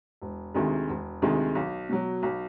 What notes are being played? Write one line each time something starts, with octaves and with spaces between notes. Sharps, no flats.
E1
D2 C3 D#3 G#3
E1
D2 C3 D#3 G#3
B1
B2 F#3
B1